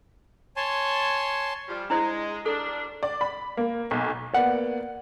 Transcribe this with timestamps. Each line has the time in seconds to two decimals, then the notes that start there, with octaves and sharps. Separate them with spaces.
0.56 C#5 G#5 A5 C6
1.68 F3 G3
1.90 G#3 D4 E4 C5
2.46 D#3 G3 D4 A4
3.03 D5
3.21 B5
3.57 A#3
3.91 B1
4.34 A#3 B3 D5 F#5